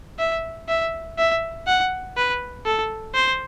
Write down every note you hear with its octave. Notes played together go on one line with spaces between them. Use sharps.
E5
E5
E5
F#5
B4
A4
C5